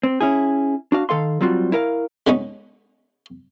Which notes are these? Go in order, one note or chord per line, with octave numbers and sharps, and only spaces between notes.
C4
C#4 E4 G#4
D4 F#4 F5
D#3 A4 F5 C6
F#3 G3 C4 F4 F#4
E4 A#4 F5
G#3 B3 C#4 D#4